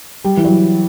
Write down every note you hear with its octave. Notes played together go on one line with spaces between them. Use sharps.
G3
E3
F#3